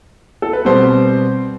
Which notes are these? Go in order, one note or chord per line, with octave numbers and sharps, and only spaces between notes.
A4
B4
B2 G3 B3 C4 C5